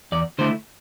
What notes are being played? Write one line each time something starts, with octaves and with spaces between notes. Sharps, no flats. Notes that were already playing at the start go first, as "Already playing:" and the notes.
E2 D5
D3 A3 E4 C5